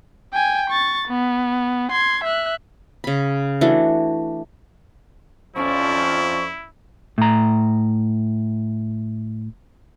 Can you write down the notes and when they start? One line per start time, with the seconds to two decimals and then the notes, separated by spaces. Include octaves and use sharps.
0.34 G5 G#5
0.70 C#6 A6
1.08 B3
1.92 C6 G#6
2.24 E5 F#6
3.04 C#3 B5
3.61 E3 A3 D4 F#4
5.56 F2 F3 C#4 E4 D5 C#6
7.18 A2 A#5